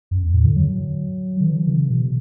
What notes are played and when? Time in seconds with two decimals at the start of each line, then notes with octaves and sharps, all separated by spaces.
0.11 F#2
0.22 E2
0.34 A2
0.45 D3
0.56 F#3
1.40 D3
1.46 E3
1.67 C#3
1.90 B2